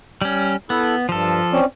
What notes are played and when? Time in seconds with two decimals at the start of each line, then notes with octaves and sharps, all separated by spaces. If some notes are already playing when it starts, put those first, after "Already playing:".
0.22 G3 C#4
0.70 B3 E4 A4
1.09 G2 F3 A4
1.53 C4 C#4 D5